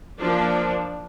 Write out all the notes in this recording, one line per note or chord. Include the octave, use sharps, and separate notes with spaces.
F3 A#3 D4